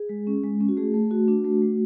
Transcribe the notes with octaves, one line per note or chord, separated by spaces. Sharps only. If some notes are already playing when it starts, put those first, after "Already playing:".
Already playing: G#4
G#3
C#4
G#3
C#4
F#4
A3 G#4
A3
F#4
D4 F#4
A3
A3